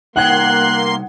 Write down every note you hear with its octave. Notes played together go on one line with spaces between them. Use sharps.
C2 A#3 D#4 F#5 G5 C6 F#6 G#6